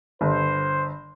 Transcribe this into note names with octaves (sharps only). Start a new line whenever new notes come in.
G1 C5